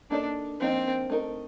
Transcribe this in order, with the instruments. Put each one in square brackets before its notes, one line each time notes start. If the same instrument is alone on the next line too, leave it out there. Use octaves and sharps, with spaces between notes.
[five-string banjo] A#3 D#4 A4 D5 [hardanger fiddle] D4
[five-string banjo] F3 A#3 D#4 [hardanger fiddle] C4
[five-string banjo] A3 D#4 A#4